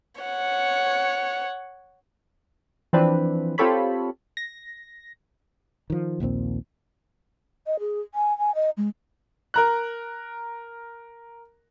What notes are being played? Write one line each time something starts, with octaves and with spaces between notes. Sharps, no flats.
C#5 F#5
E3 F3 C4 D4 B4
C4 F4 G4 A4 C#5 B5
A#6
D#3 F3
A#1 D#2 A#2 C4
D#5
G#4
G#5
G#5
D#5
G#3
A#4 A#5 F#6